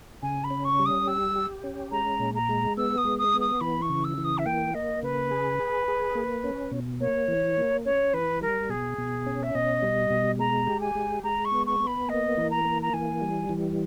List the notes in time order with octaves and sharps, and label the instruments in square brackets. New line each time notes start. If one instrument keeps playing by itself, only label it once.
[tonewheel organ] C#3 [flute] G#5
[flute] B5
[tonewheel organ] C#4
[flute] C#6
[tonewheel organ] G3
[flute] D#6
[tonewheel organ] G4 [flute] E6
[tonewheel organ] G4
C#4
[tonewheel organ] G#3 [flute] A#5
[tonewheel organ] A#2
[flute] A#5
[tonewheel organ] G#3
[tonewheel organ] B3 [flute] E6
[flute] D#6
[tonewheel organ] G#3
[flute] D#6
[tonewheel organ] B3
[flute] D#6
[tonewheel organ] E3 [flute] B5
[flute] C#6
[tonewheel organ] C#3
[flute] E6
[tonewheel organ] E3
[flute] D#6
E5
[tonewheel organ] A#3 [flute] G5
[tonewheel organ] A#3 [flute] D#5
[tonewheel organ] C#3 [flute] B4
[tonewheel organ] G#4
G#4
G#4
A#3
C#4
B2
[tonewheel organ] A#3 [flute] C#5
[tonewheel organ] E3
A#3
[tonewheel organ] C#4 [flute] C#5
[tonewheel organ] E3 [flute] B4
[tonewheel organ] G3 [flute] A#4
[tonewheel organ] B2 [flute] G#4
[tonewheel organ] B2
C#4
[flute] E5
[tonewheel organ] B2 [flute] D#5
[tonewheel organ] G3
B2
[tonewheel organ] G#3 [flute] A#5
[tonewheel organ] G4
[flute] G#5
[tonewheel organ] G#3
[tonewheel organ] G#3 [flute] A#5
[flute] C#6
[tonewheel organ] B3
[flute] C#6
[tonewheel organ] B3
[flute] B5
[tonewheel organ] A#3 [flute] D#5
[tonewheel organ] E3
[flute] A#5
[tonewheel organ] A#3
[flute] A#5
[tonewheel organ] E3 [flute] G#5
[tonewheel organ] G3
E3